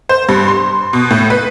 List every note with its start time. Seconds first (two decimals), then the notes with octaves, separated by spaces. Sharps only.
0.09 C5
0.29 G2
0.48 C6
0.93 B2
1.11 A2
1.30 B4